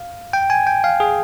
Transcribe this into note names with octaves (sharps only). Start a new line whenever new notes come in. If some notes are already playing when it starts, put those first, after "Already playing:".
Already playing: F5
G5
G#5
G5
F5
G#4